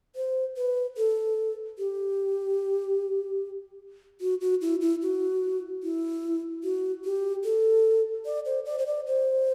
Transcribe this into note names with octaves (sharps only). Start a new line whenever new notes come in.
C5
B4
A4
G4
F#4
F#4
E4
E4
F#4
E4
F#4
G4
A4
D5
C5
D5
C5
D5
C5